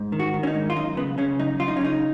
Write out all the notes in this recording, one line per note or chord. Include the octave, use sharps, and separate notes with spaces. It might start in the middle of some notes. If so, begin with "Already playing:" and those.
Already playing: G#2
D#3
F#4
D#3
C#4
D#4
G#2
F4
F#2 D#4
C#3 B3
C#3 C#4
F#2 D#4
F#2 F4
D#4
C#4
C#3 D#4